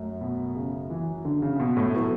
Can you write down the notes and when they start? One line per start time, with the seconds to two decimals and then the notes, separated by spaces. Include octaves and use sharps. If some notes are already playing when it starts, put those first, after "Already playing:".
Already playing: F#2 A3
0.21 B2
0.56 C#3
0.90 E3
1.25 D3
1.42 C#3
1.60 B2
1.77 A2
1.94 F#3 B3 E4 A4